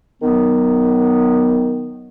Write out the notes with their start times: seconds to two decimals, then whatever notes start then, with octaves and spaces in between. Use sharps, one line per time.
0.22 D#3 F#3 B3